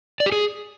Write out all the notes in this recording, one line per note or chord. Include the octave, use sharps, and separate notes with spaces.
D5
G4
G#4